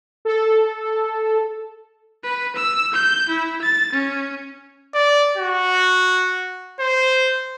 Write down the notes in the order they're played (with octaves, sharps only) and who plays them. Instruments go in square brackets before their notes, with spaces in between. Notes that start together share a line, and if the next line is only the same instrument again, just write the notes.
[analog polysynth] A4
[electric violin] B4
E6
G6
E4
A6
C#4
[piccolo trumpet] D5
F#4
C5